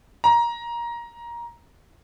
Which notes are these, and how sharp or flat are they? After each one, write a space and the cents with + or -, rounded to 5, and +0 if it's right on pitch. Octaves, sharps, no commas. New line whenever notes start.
A#5 +15